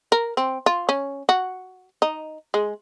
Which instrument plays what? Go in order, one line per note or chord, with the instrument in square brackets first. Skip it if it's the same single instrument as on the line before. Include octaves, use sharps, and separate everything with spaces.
[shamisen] A#4
C4
F4
C#4
F#4
D#4
G#3